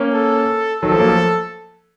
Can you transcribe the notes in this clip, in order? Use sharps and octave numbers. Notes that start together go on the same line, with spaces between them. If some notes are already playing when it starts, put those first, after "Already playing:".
Already playing: A#3 C#4
A4
D#3 F#3 A4
F3 A3
F#3 A#3
F3 A3